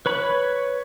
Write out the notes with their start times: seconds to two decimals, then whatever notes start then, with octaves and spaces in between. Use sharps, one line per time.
0.06 B4 C#5 B5